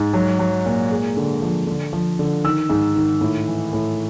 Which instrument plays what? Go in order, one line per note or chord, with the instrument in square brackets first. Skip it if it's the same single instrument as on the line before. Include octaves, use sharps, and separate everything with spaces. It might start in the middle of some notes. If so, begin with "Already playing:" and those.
Already playing: [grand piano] G#2
F#3
F#3
A#2
G#3
D3
F3
D3
F3
D3
D#3 E6
G#2
D#3
A2
E3
A2